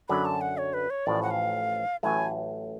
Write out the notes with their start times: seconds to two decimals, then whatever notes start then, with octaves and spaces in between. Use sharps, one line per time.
0.09 F#2 D3 F#3 B5
0.25 A5
0.41 F#5
0.58 C#5
0.74 B4
0.90 C#5
1.06 A1 A2 F3 D5
1.23 F#5
1.31 F5
2.03 A1 A2 F#3 A3 G#5